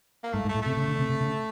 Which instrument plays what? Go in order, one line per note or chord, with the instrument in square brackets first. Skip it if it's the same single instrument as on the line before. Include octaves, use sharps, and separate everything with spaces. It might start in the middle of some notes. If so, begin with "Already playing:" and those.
[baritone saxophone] A#3
[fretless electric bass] G#2 [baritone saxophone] A3
[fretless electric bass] G#2
[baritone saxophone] A3
[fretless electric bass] A2
[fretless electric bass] C3 [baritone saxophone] A3
[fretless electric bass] C#3
D3
C3
C3
C#3